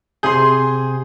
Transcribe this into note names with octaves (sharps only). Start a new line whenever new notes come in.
C3 G#4 G#5 C6 G6